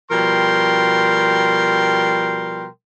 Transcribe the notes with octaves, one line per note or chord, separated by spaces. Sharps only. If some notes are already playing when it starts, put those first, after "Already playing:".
B2 F3 G3 A#4 G5 C6